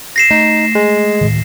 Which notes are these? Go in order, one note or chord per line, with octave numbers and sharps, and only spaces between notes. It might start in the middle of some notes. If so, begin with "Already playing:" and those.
A#6 C7 E7
A3 D#4
G#3
D2 A2 D#3